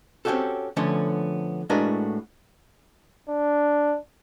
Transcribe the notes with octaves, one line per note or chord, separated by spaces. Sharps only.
C4 C#4 E4 F#4 G4 A4
D3 F3 A3 B3 C#4
A2 G#3 D4 F#4 A#4 B4
D4